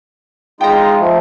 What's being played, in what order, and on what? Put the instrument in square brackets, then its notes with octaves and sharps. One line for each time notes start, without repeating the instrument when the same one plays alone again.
[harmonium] G#3 D#4 F4 [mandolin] G5 A#5
[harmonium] F3 A3